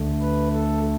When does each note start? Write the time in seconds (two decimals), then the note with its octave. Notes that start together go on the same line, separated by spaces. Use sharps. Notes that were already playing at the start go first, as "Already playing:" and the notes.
Already playing: D2 D3 A3
0.21 B4
0.52 A4